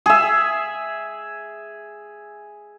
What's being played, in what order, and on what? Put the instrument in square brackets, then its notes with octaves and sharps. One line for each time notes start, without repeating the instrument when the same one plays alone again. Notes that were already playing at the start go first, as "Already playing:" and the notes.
[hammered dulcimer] G#4 E5